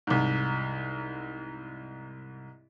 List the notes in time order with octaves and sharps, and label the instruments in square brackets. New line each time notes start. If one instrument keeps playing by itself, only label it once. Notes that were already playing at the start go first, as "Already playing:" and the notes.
[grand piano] C2 G#2